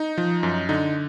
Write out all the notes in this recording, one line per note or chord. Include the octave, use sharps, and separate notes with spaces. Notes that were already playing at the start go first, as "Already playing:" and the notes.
Already playing: D#4
F3
F#2
D3 D#4